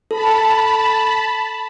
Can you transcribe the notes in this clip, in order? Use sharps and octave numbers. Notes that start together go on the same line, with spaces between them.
A4 A5 B5